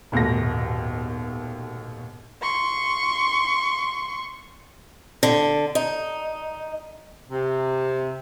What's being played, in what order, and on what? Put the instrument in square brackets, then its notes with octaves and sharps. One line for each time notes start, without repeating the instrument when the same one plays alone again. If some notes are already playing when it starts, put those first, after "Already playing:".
[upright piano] D#1 D#2 G#2 B2 A3 A#6
[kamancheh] C6 C#6
[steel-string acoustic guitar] D3
D#4
[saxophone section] C3